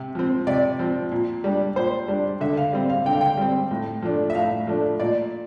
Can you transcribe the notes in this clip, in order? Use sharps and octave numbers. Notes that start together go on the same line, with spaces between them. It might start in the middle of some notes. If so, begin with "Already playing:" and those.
Already playing: C3
F3 C4
C3 D5
F3 C4
A#2
G3 D4
A#2 C5
G3 D4
D3 E5
F5
G3 C4
F5
D3 G5
F5
G5
G3 C4
A2
F3 A3 D4
E5
A2 F5
F3 A3 D4
A#2 D5